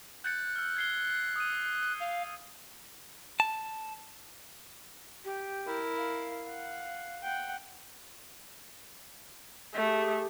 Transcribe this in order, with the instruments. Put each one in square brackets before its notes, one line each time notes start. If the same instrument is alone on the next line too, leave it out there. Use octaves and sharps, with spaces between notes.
[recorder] F#6 [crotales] G6 A6 C#7
[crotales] E6 F6
G#6 C7 G7
D#6 D#7
[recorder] F5
[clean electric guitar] A5
[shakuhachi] G4
[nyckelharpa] E4 A#4
[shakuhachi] F5
[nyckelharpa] F#5
F#5 G5
[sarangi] A3 [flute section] G4 G#4